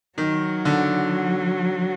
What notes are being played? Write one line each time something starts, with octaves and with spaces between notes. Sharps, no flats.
D#3 F#3
D3